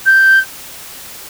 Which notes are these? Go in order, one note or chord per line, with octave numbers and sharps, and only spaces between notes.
G6